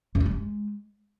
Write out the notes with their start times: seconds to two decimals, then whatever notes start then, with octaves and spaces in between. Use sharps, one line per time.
0.15 F#2
0.20 G2
0.26 G3
0.31 G#3